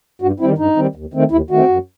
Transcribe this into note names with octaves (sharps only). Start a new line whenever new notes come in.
G2 F#4
D#3 G3 C4 E4
G2 D#4
D#3 G3 C4
D#2
D#3 A3 C4
D#2 E4
D#3 A3 C4 F#4
F#2